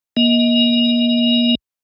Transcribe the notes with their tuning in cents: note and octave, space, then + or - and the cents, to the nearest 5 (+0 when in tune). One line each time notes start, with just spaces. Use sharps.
A#3 +35 D#5 +25